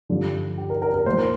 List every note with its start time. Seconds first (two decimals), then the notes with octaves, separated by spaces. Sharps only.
0.09 G2 D3 F3
0.58 G4
0.70 A#4
0.82 A#4
0.94 A#4
1.06 A#2 F3 C5
1.18 A#4